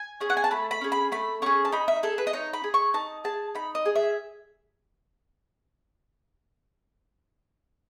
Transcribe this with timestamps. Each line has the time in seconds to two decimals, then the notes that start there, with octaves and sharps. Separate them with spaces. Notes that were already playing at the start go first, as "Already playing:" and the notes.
Already playing: G#5
0.20 C#4 G#4
0.30 F#5
0.37 G#5
0.44 A5
0.51 A3 B5
0.71 B5
0.81 C#4 G#4
0.92 B5
1.12 A3 B5
1.42 C#4 G#4 C#6
1.65 A5
1.72 D#4 B5
1.88 E5
2.03 G#4 A4
2.18 B4
2.27 D#5
2.33 D#4 C#5
2.53 B5
2.64 G#4
2.74 C#6
2.94 D#4 A5
3.24 G#4 A5
3.55 D#4 B5
3.75 D#5
3.86 G#4
3.96 E5